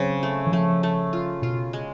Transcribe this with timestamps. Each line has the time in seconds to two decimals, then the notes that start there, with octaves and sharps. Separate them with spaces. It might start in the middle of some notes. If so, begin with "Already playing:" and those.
Already playing: C#3 F#3 C4
0.23 A3
0.47 E3
0.52 F3 A3
0.83 A3
1.13 F4
1.42 B2 F4
1.73 G#3